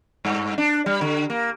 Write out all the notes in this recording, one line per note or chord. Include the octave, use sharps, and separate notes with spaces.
G2
D4
G3
D3
A#3